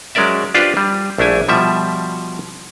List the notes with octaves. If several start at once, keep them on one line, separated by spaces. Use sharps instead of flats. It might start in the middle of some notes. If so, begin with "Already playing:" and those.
F#3 G#3 C#4 A#4 D5 E5
D4 F4 G4 B4 C5 D5
G3
A#1 A3 D4 E4 G#5
B2 F3 G3 E5